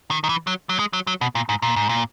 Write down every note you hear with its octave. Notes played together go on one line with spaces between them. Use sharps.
D#3
D#3
E3
F#3
F#3
G#3
F#3
F#3
B2
A#2
G#2
A#2
G#2
A#2